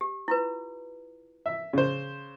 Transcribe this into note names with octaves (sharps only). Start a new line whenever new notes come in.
G4
E4 F4 B4
E5
C#3 C5